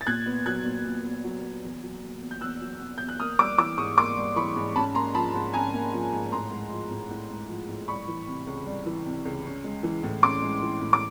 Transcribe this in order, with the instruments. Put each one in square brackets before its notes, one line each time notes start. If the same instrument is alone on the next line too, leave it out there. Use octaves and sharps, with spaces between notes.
[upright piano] A6
A#2 F#6 G#6
B3
F#3 F#6 G#6
A#2
A#2
B3
F#3
A#2
E2
F#3
B2
E2
G6
E2 E6 F#6
F#3
B2
E2 G6
F#6
A#3 D#6 F6
G3 D6 E6
E3 D6 E6
G#2 C#6 D#6
A#3 C6 D6
G3
E3 B5 C#6
G#2
C#4 A5 B5
A#3 A#5 C6
F3 A5 B5
G#2
C#4 G#5 A#5
A#3
F3
G#2
A2 A#5 C6
G#3
F3
A2
A2
G#3
F3
A2
G3 B5 C#6
E3
C3
C#2
G3
E3
C3
C#2
C#4
G#3
E3
A2
C#4 C6 D6
G#3
E3
A2
D6